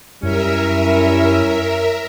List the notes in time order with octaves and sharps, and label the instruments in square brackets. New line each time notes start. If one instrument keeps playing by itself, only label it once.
[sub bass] F#2 [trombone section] G3 E4 [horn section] C#4 [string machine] A#4 E5